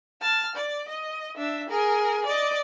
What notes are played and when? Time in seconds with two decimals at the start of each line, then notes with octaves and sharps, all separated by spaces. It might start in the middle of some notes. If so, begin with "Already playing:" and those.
0.22 A5 F6
0.56 D5
0.88 D#5
1.37 D4 E5
1.69 G#4 A#4
2.26 D5 D#5